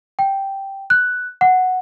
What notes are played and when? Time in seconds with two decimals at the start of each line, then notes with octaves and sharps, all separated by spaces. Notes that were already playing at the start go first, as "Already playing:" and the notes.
0.19 G5
0.90 F#6
1.41 F#5